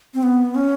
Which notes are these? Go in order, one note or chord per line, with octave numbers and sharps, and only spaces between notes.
C4
B3
C#4